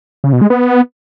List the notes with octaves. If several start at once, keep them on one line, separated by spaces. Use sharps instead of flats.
C#3
B2
G#3
B3